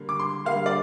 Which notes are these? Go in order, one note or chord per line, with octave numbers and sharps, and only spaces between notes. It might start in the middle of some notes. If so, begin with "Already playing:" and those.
Already playing: D3 G3 A#3
D6
C6
D3 G3 A#3 F5
D5